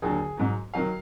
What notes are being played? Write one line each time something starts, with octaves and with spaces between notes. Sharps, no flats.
D#2 D3 F#3 G#4
G#2 F#3
D#3 F#3 F5